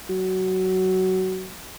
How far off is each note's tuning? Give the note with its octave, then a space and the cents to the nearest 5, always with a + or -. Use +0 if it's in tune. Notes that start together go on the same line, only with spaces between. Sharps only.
F#3 +15